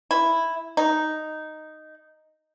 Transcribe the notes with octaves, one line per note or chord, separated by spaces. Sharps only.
E4
D#4